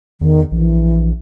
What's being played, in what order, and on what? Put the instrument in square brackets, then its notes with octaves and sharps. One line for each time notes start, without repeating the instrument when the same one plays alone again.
[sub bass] E2 [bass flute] D#3
[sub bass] A#1 [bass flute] E3